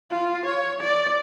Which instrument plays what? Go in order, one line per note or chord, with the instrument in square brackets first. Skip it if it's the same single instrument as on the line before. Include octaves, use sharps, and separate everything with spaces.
[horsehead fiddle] F4
C#5
D5